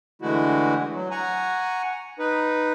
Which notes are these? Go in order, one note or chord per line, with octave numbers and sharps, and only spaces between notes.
D3 E3 G#3 A3 E4 F#4
F#3
F#5 G#5 A#5 C#6
D#4 B4